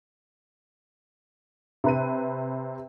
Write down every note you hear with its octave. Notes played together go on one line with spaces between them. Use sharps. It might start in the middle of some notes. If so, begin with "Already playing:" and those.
C3 B4 D#7